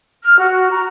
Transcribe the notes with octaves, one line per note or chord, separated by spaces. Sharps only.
F6
F#4
A#5